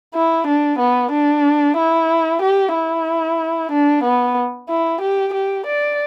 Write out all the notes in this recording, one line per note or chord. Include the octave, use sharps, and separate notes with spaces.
E4
D4
B3
D4
E4
G4
E4
D4
B3
E4
G4
G4
D5